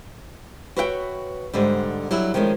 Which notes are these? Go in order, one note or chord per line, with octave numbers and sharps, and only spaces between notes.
F#4 B4 C#5 E5 F5 G5
G#2 D3 G3
F#3 G3 E4
D#3 F3 G#3 A3 C#4